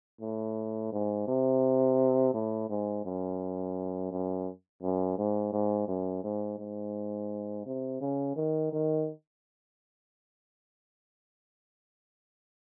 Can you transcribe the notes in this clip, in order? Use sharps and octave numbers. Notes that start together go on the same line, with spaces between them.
A2
G#2
C3
A2
G#2
F#2
F#2
F#2
G#2
G#2
F#2
G#2
G#2
C3
C#3
D#3
D#3